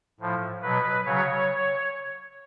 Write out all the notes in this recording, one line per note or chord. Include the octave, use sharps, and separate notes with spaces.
A2 F3
B2 F#3 B4
C#3 F#3 C#5